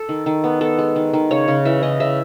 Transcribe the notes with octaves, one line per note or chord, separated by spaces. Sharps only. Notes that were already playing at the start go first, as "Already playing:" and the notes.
Already playing: A4
D#3
D#3
B3
B3 A4
G#3
D#3
D#3
C#3 C#5
C#3
E3 E5
C#3 D#5
C#3 E5